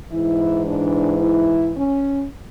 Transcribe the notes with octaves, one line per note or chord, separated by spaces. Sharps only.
G#2 E3 E4
D4
E4
C#4